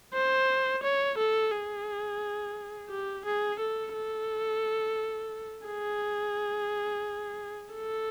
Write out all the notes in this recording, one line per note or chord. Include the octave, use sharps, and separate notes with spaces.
C5
C#5
A4
G#4
G4
G#4
A4
A4
G#4
A4